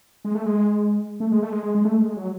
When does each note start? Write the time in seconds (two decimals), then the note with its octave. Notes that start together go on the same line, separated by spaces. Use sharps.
0.25 G#3
0.35 A3
0.46 G#3
1.20 A3
1.32 G#3
1.42 A3
1.52 G#3
1.63 G#3
1.75 G#3
1.85 A3
2.02 G#3
2.17 F#3